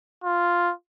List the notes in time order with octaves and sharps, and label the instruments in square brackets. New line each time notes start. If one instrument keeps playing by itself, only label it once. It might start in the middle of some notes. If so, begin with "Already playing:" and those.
[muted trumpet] F4